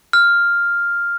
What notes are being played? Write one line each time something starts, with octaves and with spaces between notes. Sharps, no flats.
F6